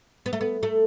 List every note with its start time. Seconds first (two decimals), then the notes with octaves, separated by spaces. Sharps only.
0.26 B3
0.33 A3
0.41 B3
0.63 A3